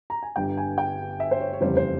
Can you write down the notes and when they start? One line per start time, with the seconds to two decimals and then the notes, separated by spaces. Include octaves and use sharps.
0.10 A#5
0.23 G#5
0.36 G1 G2 G3 G5
0.58 G#5
0.78 G5
1.20 E5
1.31 C5
1.40 C#5
1.53 C#5
1.61 F1 E2 C#3 E3 G3 C5
1.77 C5